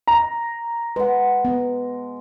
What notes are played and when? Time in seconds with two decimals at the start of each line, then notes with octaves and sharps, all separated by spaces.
0.07 A#5
0.96 G#3 B4 F#5
1.45 B3